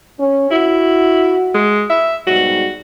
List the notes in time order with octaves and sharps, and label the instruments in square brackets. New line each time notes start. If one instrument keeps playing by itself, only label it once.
[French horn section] C#4
[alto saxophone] E4 [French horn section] F#4
[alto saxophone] G#3
E5
[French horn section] G#2 B2 G3 [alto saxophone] F#4